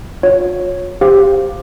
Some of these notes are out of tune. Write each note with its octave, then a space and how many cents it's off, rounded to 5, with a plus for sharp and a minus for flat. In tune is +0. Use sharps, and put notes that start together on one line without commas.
F4 +45 C#5 -5
G4 +10 C5 +0 F5 +0